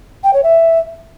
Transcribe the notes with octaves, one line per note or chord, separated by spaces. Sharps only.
G5
C#5
E5